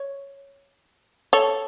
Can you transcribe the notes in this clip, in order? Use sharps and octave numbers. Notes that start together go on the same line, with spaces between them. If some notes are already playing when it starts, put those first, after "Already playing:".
Already playing: C#5
A4 C#5